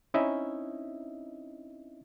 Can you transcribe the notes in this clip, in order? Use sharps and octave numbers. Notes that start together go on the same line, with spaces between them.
C4 C#4 D#4 E4 D#5 E5